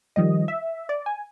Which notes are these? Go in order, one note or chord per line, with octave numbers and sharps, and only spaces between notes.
D#3 F3 G3 D#5
E5
D5
G#5